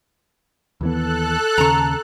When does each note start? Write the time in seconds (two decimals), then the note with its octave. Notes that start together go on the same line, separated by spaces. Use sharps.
0.81 D#2 E3 B3 A4 F#6
1.58 D#2 C#3 A#5 C#6